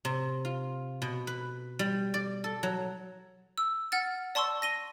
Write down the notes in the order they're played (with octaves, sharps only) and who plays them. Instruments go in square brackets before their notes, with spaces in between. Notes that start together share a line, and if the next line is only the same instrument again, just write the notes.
[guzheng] C3
F4
B2
B4
G3
D5
A4
F#3
[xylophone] E6
F#5 F6 A6
D5 A5 C6 C#6 E6
A#6 D#7 G7